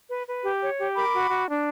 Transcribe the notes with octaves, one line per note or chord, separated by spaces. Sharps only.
B4
B4
G4
C#5
G4
A#4 B5 D6
F#4
F#4
D4